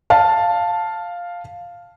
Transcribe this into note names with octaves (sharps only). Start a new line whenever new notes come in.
F5 A5